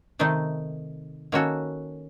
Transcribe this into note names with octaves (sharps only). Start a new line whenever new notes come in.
C3 D#3 A3 D#4
D#3 A#3 C#4 F#4 A4